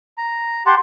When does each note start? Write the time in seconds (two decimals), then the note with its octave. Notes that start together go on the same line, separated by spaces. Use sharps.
0.18 A#5
0.66 G4 F#5 A5 C6